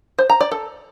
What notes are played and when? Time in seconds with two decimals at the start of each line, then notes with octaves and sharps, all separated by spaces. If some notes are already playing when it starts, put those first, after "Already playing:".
0.19 C5
0.30 A#5
0.41 D5
0.52 A4